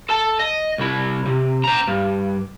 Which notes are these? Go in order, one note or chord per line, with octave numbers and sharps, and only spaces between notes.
A4 A5
D#5
C2 E4
C3
C5 A#5
G2